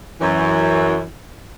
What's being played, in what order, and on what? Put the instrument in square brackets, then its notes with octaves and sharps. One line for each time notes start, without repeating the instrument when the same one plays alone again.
[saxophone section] F#2 E3